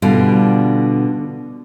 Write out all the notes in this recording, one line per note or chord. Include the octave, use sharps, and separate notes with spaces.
B2 D3 G3 F4